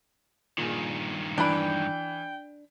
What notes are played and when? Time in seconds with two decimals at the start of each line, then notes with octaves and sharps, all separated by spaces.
0.58 G2 A#2 D#3 G#4
1.38 E3 D4 G5 B5